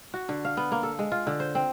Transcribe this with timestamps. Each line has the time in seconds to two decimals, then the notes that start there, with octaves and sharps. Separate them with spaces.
0.14 F#4
0.29 D3
0.45 F5
0.57 B3
0.72 A#3
0.83 A4
0.99 G#3
1.12 F4
1.27 D3
1.40 C5
1.55 C4